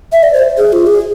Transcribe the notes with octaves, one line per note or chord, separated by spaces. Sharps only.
E5
D5
C5
G#4
F4
G#4